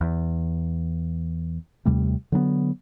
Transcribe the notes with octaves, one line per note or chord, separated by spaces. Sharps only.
E2
D#2 C3 G3 A3
D3 F#3 A#3 B3